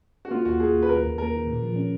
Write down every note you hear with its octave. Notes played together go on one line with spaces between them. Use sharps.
F#4
A#3 F4
D#2 F#4
A#3 G#4
D#2
B4
D#2 A#4
D#2
A#3 A#4
D#3
A#2
F3
C#4